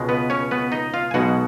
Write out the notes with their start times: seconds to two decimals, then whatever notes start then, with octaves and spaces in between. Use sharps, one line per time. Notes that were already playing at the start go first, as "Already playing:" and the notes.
Already playing: C#2 B2 G#3
0.09 B3 B4
0.30 C#4 C#5
0.51 B3 B4
0.72 D#4 D#5
0.94 F4 F5
1.11 G#5
1.14 B1 B2 G#3 F#4 F#5